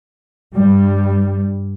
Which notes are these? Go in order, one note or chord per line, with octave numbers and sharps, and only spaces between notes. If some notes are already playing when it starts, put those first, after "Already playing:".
G2 G3